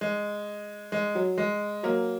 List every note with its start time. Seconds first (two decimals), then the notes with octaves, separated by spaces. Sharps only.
0.01 G#3
0.92 G#3
1.15 F#3
1.38 G#3
1.83 F#3 A#3